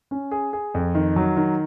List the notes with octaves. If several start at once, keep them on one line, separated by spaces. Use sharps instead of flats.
C#4
G#4
G#4
F2
D#3
F#3
D#3